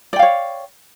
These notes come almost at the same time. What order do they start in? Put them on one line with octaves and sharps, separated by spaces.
D5 G5 F5 C#5